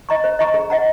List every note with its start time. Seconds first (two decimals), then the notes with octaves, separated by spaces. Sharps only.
0.09 D#5 A#5 C#6
0.24 C5
0.39 D#5 A#5 C#6
0.54 G#4
0.70 D#5 F#5 A#5